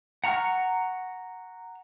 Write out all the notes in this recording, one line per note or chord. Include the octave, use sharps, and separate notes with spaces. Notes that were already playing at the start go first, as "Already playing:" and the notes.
F#5 A#5 C#6 F6